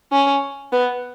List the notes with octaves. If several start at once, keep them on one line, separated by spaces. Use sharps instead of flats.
C#4
B3